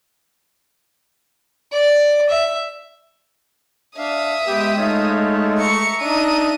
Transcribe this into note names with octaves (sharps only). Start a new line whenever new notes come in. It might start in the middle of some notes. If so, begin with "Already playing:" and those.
D5
E5
D4 E5 F5 D#6
G#3 B3 G4
A3 D#4 F4 C#5
E5 A#5 C#6 C#7
D4 D#4 D#5 D#7